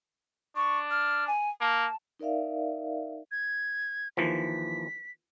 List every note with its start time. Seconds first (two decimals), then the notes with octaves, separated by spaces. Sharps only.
0.56 D4 C#6
0.91 F6
1.27 G#5
1.61 A#3 A5
2.19 D#4 A#4 D5 E5 F5
3.32 G#6
4.17 D#2 E3 F3 B6